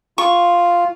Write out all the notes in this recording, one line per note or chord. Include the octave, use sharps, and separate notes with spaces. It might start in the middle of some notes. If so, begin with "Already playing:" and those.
F4 C#6